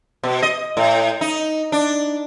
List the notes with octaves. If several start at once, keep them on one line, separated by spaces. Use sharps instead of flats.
B2
D#5
A2
D#4
D4